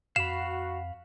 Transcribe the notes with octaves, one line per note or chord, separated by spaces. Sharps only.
F2 F#4 F5 B5 E7